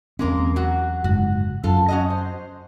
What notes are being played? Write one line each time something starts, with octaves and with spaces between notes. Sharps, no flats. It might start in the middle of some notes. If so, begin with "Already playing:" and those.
E2 G#3 A#3 C4 C#4 A#4
F#3 F#4
F#1 G#2 F#4
F#2 F4 A4
C#4 F#4 D#5
C5